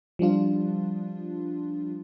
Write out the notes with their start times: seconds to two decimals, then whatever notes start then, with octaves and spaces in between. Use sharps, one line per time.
0.19 F3 G3 D4 F4